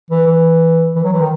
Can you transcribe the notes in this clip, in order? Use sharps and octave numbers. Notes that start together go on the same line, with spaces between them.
E3
E3
E3
F#3
E3
D#3